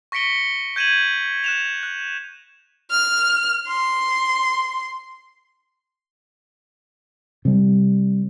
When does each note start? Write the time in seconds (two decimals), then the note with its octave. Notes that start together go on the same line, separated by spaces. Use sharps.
0.12 C#6 A#6 B6 C#7 D7 G7
0.76 G6 G#6 D#7 E7 F#7
1.44 F#6 E7 F7
1.83 F#6
2.91 F6
3.68 C6
7.45 C3 G3